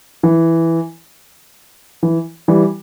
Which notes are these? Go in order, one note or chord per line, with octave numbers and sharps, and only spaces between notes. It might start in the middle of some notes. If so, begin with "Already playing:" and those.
E3
E3
E3 G3